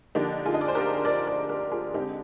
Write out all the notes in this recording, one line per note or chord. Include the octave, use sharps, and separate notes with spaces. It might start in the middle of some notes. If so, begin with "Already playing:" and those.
D3 F3 A#3 D4 D#4 G4
F4 G#4
D#5
D5
C5
G4 A#4
A#4 D5
A#4 D5
G4 A#4
F4 G#4
D3 G#3 C4 D#4 G4